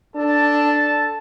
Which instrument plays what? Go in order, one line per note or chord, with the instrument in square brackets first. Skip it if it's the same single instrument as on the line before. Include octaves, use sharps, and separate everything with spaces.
[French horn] D4 [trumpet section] A4 A5